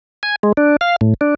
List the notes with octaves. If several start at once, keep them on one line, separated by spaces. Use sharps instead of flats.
G#5
G#3
D4
F5
A2
D4